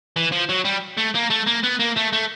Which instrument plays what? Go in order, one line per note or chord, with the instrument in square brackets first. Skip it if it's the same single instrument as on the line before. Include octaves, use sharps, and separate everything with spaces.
[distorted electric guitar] E3
F3
F#3
G3
A3
A#3
A3
A#3
B3
A#3
A3
A3